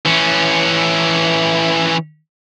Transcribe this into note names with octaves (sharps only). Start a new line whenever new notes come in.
E3 C#4